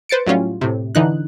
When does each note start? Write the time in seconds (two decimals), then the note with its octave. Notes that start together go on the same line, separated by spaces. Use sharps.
0.09 B4 C5 A6 C#7 D7
0.27 A2 F#3 G3 C#4 F4
0.61 A2 C3
0.95 D3 E3 D#4 F#6